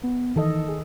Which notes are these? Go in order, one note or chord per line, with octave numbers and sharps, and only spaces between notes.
B3
D#3 E3 A4 D#5
G#4